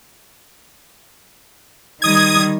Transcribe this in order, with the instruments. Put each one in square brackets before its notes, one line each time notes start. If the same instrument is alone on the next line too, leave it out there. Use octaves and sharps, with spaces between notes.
[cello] D#3 G3 [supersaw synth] D#6 G#6